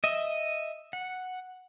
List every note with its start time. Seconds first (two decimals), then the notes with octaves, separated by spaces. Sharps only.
0.04 D#5 E5
0.93 F#5